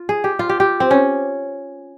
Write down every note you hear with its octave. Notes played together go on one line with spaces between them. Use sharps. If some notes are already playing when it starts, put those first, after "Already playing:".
Already playing: F4
G#4
G4
F4
G4
G4
C4
C#4